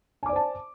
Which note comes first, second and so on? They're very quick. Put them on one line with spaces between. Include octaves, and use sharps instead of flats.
G#5 D6 D5 C5 A5